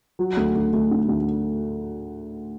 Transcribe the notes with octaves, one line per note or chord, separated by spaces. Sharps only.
F#3
D2
D2
D2
D3
D2